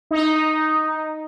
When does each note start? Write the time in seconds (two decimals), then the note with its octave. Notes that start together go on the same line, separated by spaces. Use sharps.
0.11 D#4